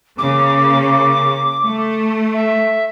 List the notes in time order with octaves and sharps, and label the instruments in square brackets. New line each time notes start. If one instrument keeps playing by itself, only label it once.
[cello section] C#3 A#3 [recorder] D6
[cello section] A3
[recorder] E5